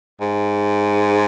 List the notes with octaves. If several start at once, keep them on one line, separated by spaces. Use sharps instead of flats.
G#2